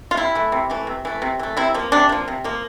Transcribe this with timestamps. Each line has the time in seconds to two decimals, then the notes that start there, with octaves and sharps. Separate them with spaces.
0.11 F4
0.17 C3 E4
0.35 E3 A3
0.52 C3
0.70 E3 A3
0.87 C3
1.05 E3 A3
1.22 C3
1.39 E3 A3
1.57 C3 E4
1.74 F3 A#3
1.92 C3 D4
2.09 F3 A#3
2.28 C3
2.44 F3 A#3